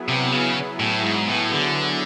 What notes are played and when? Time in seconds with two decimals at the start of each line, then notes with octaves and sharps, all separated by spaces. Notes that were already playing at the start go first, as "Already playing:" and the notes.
Already playing: F#3 B3 E4 G#4
0.08 C3
0.32 C#3
0.80 A2
1.03 G#2
1.28 A2
1.51 D3